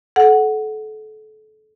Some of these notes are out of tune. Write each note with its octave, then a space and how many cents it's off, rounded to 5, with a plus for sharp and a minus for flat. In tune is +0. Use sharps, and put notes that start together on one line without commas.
A4 -30 F#5 +0